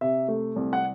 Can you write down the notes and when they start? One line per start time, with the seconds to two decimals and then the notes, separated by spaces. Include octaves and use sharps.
0.01 C3 E5
0.28 A3
0.56 C2
0.73 F#5